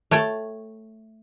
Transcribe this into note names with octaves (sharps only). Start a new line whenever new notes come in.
A3 C#5 G5 A5